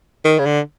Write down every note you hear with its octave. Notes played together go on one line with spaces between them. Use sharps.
D#3
C#3
D3